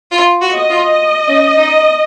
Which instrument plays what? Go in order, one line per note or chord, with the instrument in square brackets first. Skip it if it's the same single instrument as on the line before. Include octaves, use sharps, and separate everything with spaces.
[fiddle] F4
F#4
[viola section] D#5
[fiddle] F4
C#4
D#4